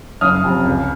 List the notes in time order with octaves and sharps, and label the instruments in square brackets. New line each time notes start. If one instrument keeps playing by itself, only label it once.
[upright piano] F#1 D#6 F6
F2 C3
C#2